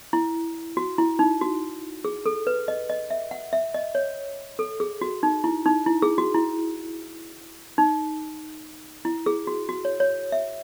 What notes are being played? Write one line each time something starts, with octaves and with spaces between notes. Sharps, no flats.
E4
F#4
E4
D#4
F#4
G#4
A4
B4
D#5
D#5
E5
F#5
E5
D#5
C#5
A4
G#4
F#4
D#4
E4
D#4
E4
G#4
F#4
E4
D#4
E4
G#4
F#4
F#4
C#5
C#5
E5